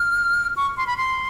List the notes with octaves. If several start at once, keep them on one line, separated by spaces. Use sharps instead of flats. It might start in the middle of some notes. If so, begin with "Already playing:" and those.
Already playing: F6
C#6
C6
B5
C6